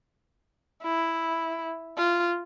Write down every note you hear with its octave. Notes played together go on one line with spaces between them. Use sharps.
E4
F4